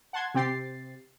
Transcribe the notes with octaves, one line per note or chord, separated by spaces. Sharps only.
F#5 A5 C6 G#6
C3 C4 G4 A6 C7